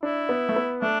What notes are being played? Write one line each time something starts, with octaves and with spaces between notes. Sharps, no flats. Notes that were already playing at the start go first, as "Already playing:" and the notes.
D4 E4
B3
A3
B3
A3 D4